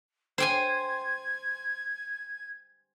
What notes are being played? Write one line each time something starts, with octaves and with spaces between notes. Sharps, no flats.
C5 G5 G#5 G#6